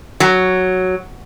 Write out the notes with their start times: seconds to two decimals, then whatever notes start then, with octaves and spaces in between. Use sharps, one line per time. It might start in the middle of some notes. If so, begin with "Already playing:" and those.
0.20 F#3